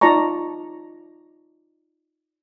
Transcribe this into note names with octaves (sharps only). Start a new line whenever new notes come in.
D#4 F4 D5 A5 A#5 C#6